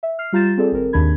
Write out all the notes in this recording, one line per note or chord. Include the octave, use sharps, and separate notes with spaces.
E5
F6 C7
G3 F4 A#5 G6 A6 E7
C4 F4 G#4 A4 D5
G#1 C4 A#4
D#2 G#2 D#3 D4 B5 G#6